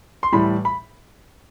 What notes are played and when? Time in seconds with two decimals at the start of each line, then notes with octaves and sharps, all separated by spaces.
0.23 C6
0.32 A2 E3 G3 B5
0.65 B5